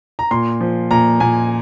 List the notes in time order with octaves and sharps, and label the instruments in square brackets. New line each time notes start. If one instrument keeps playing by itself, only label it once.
[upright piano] A#5
A#2 C6
F3
A#2 A#5
A#2 G#5